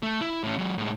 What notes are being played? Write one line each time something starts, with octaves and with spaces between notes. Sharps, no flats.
A3
E4
A2 C#4
F#3 G#3
A2 G#3